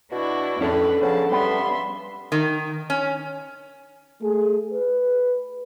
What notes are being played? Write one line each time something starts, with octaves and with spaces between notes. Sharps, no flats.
B2 D4 E4 F#4
F2 A2 C#4 D4 A4 B4
C#3 F3 B3 A5
G2 G3 B3 E5 C6
D#3
C#4
A3 G#4
B4